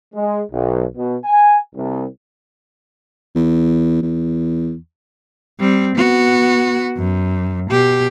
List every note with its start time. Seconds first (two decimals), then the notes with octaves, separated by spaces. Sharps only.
0.13 G#3
0.51 B1
0.96 B2
1.25 G#5
1.75 C2
3.35 E2
4.02 E2
5.60 G3 C4
5.96 B3 F#4
6.97 F#2
7.71 B2 G4